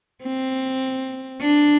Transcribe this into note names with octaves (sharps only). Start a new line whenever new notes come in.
C4
D4